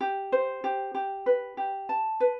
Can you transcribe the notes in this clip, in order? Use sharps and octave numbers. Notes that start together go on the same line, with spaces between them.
G4
C5
G4
G4
B4
G4
A5
B4